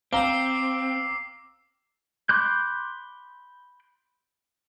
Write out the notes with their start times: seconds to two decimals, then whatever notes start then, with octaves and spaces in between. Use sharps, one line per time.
0.13 C4 F5 A#5 D6 E6 C7
2.29 B5 C6 D6 F#6 G6